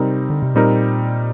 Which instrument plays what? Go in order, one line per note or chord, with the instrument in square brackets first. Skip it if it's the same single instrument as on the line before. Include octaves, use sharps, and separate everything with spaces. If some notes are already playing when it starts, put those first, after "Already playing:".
Already playing: [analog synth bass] C3 [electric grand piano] G3 C4 D#4 A#4
[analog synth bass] D3
C3
[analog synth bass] A#2 [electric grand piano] G3 C4 D#4 A#4